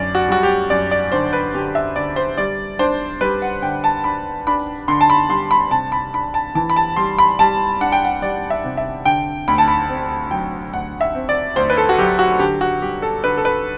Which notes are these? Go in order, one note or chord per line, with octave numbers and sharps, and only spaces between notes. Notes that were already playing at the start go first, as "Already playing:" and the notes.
Already playing: F#2 D3 D5
F#4
G3 F#4
G4
F#2 D5
D5
D3 C5
B4
D3 G4
E5
D3 D5
C5
G3 D5
D4 C5
G3 B4
F#5
D3 G5
A5
D4 B5
D4 B5
D3 C6
A5
B5
G3 C6
B5
C3 A5
B5
D4 B5
A5
E3 A5
B5
A5
G3 C6
B5
G3 A5
D4 F#5
G5
F#5
G3 D5
E5
C3
E5
D3 G5
D2 B5
A5
B5
C4
F#3 G5
D2 F#5
E5
C4
D5
D2 C5
B4
A4
F#4
F#3 G4
F#4
D3 G4
F#4
G3 G4
A4
D3 B4
A4
B4